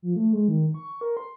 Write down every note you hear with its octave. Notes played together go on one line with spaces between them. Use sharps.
F3
A3
G#3
D#3
C#6
A#4
C6